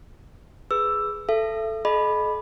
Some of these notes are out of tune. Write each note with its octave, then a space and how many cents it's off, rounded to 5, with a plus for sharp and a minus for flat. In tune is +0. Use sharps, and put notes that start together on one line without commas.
G#4 +0 B4 +0 E6 +10
A4 +0 E5 +35
A4 -45 D#5 -25 B5 +0